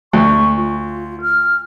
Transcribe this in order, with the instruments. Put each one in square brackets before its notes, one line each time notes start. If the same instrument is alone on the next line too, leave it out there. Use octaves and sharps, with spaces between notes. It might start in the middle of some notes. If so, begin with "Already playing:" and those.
[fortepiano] D2 [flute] C#6
[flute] F4
F6